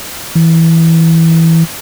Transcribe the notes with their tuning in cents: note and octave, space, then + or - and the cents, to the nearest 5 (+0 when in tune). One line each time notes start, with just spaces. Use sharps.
E3 -10